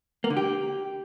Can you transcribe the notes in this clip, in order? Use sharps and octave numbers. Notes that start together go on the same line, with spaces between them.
A#3
D3
G4